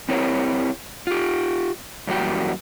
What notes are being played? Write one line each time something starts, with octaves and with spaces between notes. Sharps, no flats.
C4 E4 G4 A#4 C#5
F4 G4
F#2 E3 G3 A#3 F#4 G5